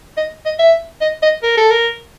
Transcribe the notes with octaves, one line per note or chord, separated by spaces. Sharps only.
D#5
D#5
E5
D#5
D#5
A#4
A4
A#4